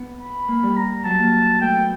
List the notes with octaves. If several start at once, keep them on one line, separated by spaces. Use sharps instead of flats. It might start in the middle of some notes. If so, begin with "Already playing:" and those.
Already playing: B3
B5
A#3
G3
A#5
F#3 A5
A#3
A3 G5
B3